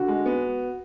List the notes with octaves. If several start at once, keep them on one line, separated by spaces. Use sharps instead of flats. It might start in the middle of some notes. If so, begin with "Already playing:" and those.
Already playing: D3 F#4
G#3
B3